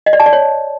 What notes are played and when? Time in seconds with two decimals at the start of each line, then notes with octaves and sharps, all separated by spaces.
0.06 D#5
0.13 D5
0.20 A5
0.26 D5
0.33 C#5